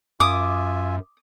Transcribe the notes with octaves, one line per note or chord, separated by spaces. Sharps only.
F#2 F4 E5 G#5 D6 D#6